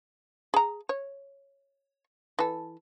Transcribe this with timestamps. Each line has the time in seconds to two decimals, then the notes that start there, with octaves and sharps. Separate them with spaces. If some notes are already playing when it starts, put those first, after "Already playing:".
0.54 G#4 A#5
0.89 C#5
2.39 E3 A4